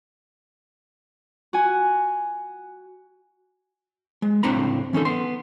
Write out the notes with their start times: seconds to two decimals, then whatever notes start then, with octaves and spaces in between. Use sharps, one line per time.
1.53 F#4 G#5
4.22 G#3
4.43 C#2 A2 C4 D4 A#5 B5
4.93 E3 C#4 D#4 A4
5.05 B3 C6